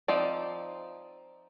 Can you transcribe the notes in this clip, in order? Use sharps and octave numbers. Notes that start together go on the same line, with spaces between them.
F3 C4 D#4 D5